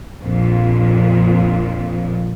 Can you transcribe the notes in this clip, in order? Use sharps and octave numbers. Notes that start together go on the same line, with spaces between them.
A#1 F2 A#2